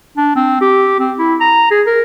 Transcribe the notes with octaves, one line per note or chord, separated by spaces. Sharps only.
D4
C4
G4
C4
E4
A#5
G#4
A#4